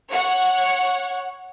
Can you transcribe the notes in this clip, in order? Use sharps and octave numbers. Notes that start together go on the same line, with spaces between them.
C#5 F#5